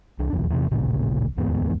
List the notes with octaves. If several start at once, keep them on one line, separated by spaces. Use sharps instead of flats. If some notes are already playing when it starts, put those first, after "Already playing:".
C2 D4
F1 B1 E2
E2 C3
D1 A1 A#2 C#3
D1 E2 G#2 B3